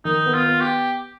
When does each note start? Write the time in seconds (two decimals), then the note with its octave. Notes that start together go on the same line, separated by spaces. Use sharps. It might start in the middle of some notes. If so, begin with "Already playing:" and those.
0.04 D#3 D#4
0.26 B3
0.34 F4
0.47 B3
0.61 G4